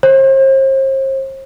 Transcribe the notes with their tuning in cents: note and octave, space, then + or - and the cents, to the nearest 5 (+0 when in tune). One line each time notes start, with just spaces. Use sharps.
C5 +40